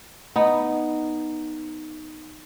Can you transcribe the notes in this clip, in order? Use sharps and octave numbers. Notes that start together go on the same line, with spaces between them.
B3 D#4